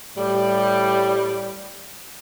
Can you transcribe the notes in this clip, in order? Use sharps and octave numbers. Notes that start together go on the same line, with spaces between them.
A2 G3